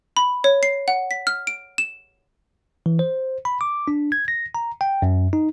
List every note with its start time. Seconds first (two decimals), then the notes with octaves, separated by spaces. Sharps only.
0.17 B5
0.44 C#5
0.63 C7
0.88 F#5
1.11 B6
1.27 F6
1.47 D7
1.78 E7
2.86 E3
2.99 C5
3.45 B5
3.61 D6
3.88 D4
4.12 G#6
4.28 A#6
4.55 A#5
4.81 G5
5.02 F#2
5.33 D#4